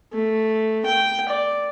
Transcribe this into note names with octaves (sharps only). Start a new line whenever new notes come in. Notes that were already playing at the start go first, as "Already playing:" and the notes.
A3
G5
D5